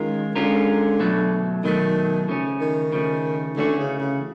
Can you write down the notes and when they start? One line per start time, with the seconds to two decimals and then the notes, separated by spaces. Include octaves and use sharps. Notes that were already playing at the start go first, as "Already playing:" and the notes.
Already playing: D#3 G#3 C#4 F4 A#4
0.36 D3 G#3 C#4 F4 A#4
1.00 B2 F#3 A3
1.64 B2 D#3 F#3 A3
2.28 C#3 F3 A3 C#4
2.61 D#3
2.92 C#3 F3 A3 C#4
3.57 D3 E3 A3 C#4 F#4
3.79 C#3
4.00 C#3